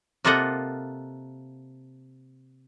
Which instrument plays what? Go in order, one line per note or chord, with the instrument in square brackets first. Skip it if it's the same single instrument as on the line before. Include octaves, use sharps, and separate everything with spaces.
[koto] C3 A#3 F4 A4 D#5 F#5